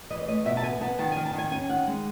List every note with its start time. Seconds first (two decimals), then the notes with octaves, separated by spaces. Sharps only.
0.10 E3 D#5
0.21 C#5
0.28 A3 D#5
0.45 B2 E5
0.57 A5
0.63 B3 G#5
0.81 B3 A5
0.99 D#3 A5
1.12 D#3 G#5
1.25 A5
1.33 D#3 G#5
1.51 C#4 G#5
1.69 D#3 F#5
1.87 G#3